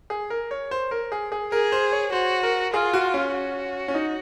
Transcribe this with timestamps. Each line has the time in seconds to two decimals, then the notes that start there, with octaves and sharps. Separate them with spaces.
0.10 G#4
0.30 A#4
0.51 C#5
0.71 C5
0.91 A#4
1.12 G#4
1.32 G#4
1.52 G#4 A#4
1.72 C5
1.92 C#5
2.12 F#4 C5
2.43 A#4
2.73 F4 G#4
2.93 F#4
3.14 C#4
3.33 F#4
3.88 C#4
3.94 D#4